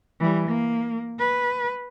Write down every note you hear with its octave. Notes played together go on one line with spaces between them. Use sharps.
E3 G3
A#3
B4